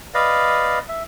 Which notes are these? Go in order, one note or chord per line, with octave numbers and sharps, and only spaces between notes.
B4 D5 D#5 F5
E5